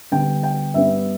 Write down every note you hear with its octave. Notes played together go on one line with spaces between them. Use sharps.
D2 D3 G3 B3 G5
G5
G2 G3 B3 E5